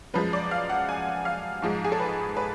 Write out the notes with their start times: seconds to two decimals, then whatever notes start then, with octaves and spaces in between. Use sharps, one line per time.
0.14 F#2 F3 G#3 B4
0.33 D5
0.51 F5
0.69 F#5
0.89 G#5
1.25 F5
1.62 G#2 F3 G#3
1.85 G#4
1.92 A4
2.00 B4
2.37 B4